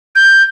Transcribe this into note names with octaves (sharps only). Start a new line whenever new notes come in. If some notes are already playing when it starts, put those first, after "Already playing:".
G6